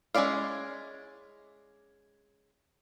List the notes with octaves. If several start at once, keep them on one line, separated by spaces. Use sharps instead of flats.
G#3 C#4 E4 D5 F5